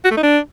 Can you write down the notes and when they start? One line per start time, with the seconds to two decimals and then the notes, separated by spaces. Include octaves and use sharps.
0.05 F#4
0.11 A3
0.17 D#4
0.23 D4